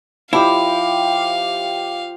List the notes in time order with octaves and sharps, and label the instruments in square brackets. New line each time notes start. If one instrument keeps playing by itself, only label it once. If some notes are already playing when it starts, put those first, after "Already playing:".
[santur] F3 G4 D#5 [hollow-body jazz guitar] E4 [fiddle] F5